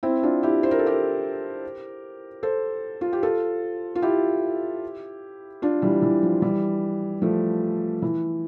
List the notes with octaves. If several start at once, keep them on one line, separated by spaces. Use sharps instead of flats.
C4 E4
D4 F4
E4 G4
C5
A#4
A4
G4 A#4
A4 C5
F4
G4
F4 A4
F4
E4 G4
D4 F4
E3 G3
E3
F3
E3 G3
F3 A3
E3